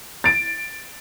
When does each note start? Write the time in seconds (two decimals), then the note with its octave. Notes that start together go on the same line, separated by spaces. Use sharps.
0.24 A6 D7